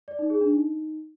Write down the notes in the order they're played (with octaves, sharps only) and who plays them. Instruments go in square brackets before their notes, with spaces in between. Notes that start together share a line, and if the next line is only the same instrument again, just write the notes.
[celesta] D5
D#4
G#4
D4
D#4